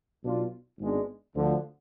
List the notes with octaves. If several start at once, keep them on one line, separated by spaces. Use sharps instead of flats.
B1 B2 B3 D4 F4
G#1 G#2 G#3 B3 D4
D2 D3 F3